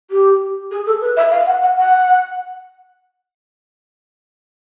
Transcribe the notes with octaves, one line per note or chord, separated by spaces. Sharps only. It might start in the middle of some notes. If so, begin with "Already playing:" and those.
G4
G#4
A4
B4
E5
F5
F#5
F#5
F#5